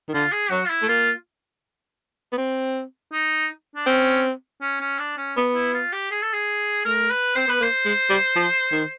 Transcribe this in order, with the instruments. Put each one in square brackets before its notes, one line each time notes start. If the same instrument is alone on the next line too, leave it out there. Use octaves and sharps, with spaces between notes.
[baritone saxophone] D#3
[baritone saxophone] D3 [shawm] F4
[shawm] G#4
[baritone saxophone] F#3 [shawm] F#4
[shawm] F4
E4
[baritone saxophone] A3
[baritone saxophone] A#3 [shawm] F4
[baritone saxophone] B3
C4
[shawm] D#4
D4
[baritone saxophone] C4 [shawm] C#4
[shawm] C#4
C#4
D4
C#4
[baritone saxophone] B3
[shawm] E4
F4
G4
G#4
A4
G#4
[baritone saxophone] A3 [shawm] A#4
[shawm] B4
[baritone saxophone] C4 [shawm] C5
[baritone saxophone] B3 [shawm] B4
[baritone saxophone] A#3 [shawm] C5
[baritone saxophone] G#3
G3
F3
D#3